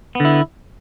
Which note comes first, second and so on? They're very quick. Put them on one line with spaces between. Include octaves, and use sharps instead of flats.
B3 D3 E4